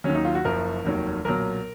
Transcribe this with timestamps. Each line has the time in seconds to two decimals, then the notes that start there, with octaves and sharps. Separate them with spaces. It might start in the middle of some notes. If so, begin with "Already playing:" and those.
0.04 D#2 D#3 F#3 C#4
0.15 D#4
0.25 F4
0.35 F#4
0.45 F#1 F#2 F3 A#4
0.85 F1 D#2 D#3 F#3
1.25 B1 A#2 F#3 A#4